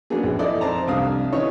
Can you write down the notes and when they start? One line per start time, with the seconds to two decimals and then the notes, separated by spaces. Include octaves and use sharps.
0.10 F#3 A#3 B3 C#4 D4 G#4
0.24 A#1
0.39 D#4 E4 A4 D5 D#5
0.61 F2 C5 A5 A#5
0.88 C2 F2 D4 F5 D#6
1.33 D#3 E3 C#4 D#4 C#5